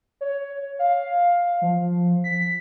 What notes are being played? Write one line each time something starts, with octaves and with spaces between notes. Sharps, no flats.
C#5
F5
F3
B6